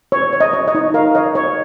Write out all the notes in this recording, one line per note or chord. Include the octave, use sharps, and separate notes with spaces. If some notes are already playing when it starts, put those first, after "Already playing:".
C#5
C#5
D#5
C#5
D#5
D#4
A#4 F5
C#5 D#5
C#5